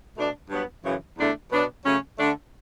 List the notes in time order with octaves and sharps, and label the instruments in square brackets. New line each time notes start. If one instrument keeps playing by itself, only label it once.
[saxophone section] B2 A3 D4
G2 F#3 B3
F#2 C#3 E3
E2 D3 A3 D4
B2 F#3 B3 D4
C#3 F#3 A3 C#4
D3 A3 D4